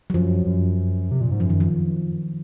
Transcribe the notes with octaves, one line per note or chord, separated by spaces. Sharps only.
F#3
F#2 F3
F#2
C3
A#2
G#2
F#2 F3
D#3
F3